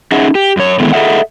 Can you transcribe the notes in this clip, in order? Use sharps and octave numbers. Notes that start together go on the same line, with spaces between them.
C#4 D#4 G#4 D#5 E5 F#5
G4
F#2 C#5
D#3 E3 G#3 A3 B3
G#4 A4 D#5 E5 F#5